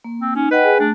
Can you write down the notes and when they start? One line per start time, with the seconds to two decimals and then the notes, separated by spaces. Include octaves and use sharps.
0.04 A#3
0.20 C4
0.36 C#4 D#4
0.51 B4 D#5 F#5 G5
0.63 G#4 G#5
0.80 A3 D4